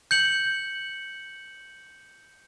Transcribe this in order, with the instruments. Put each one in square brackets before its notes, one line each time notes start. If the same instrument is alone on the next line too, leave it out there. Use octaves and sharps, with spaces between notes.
[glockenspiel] G6 C#7 F#7